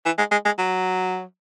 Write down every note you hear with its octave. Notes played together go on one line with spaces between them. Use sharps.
E3
G#3
G#3
G#3
F#3